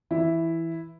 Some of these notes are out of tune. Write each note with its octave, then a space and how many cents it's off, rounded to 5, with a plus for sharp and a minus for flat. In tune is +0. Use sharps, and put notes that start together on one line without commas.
E3 +0 E4 +0